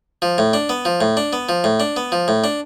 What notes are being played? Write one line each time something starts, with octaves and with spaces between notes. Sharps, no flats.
F3
A2
D4
B3
F3
A2
D4
B3
F3
A2
D4
B3
F3
A2
D4